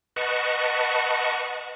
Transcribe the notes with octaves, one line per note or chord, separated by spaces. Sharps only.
B4 D#5 F#5 A5 C#6